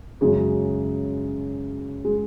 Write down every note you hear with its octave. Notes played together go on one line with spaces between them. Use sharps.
F#2 C#3 G#3
G#3